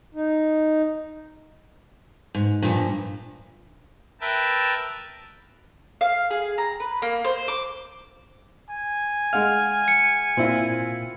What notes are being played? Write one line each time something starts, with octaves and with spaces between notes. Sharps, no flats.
D#4
G#2
G2 A#2 F3
A#4 B4 E5 G5 A5 E6
F5
G#4
A#5
B4
A#3
C5
D6
G#5
G#3 F5 F#5 F6
C#7
A#2 C4 E4 F4